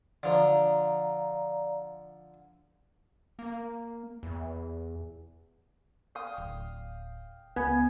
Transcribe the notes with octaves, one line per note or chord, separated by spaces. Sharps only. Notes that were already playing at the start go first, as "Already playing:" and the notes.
D3 F3 D5 F5 A#5
A#3
E2
F5 G5 D#6
D1
C#2 B3 G#5